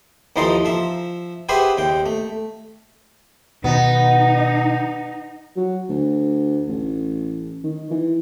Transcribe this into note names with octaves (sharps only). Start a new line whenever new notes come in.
D#2 E3 F3 D#4 A4 C6
F3 E5
G4 G#4 B4 C5 E5 F#5
D#2 G5
A3
B2 D#3 B3 D#4
F#3
D2
A1
D#3
E3